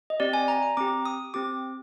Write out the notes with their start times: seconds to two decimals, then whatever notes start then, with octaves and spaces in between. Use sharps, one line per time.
0.10 D#5
0.20 C4 G4 D5
0.33 G#5
0.48 A#5
0.63 A#5
0.77 C4 G4 D6
1.05 D#6
1.34 C4 G4 D6